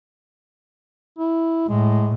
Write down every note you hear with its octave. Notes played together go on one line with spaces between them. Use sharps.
E4
A2 G#3